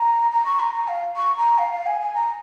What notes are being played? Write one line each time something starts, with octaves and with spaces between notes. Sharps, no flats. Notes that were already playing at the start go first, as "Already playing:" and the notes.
Already playing: A#5
A#5
C#6
A#5
A#5
F5
C#6
A#5
F5
F5
G#5
G#5
A#5